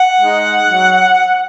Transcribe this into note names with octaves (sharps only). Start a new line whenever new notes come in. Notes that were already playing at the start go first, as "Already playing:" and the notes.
Already playing: F#5
G#3 D#4
F#3